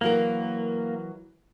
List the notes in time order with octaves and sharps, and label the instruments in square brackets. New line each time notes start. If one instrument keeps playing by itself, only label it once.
[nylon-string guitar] E3 F#3 A#4 [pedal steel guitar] A#3